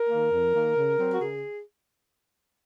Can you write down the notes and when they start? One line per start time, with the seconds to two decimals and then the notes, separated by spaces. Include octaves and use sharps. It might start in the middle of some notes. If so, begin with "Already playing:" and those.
Already playing: A#4
0.10 D#3 A#3
0.32 F2
0.54 D#3 A#3
0.77 C#3
0.99 F#3 C4
1.13 F#4
1.21 C#3 G#4